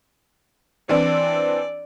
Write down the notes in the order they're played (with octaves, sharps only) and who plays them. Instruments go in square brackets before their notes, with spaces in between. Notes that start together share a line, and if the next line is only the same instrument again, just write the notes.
[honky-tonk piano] E3 C4 D4 [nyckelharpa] D5